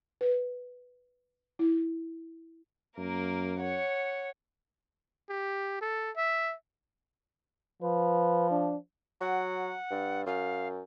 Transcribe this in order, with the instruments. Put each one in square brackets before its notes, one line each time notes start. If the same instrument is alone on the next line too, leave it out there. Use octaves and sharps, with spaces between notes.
[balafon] B4
E4
[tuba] F#2 [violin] A#3 A#4
[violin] C#5 F#5
[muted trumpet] G4
A4
E5
[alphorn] F3 [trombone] B4
[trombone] D4
[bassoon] F#3 [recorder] F#5
[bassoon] G2
[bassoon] F#2 [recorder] F5